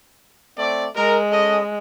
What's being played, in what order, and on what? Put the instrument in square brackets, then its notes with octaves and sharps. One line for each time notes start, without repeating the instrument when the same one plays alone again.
[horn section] A3 C4 D5
[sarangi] G#3 [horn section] A#4
[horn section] C#4 A4 D#5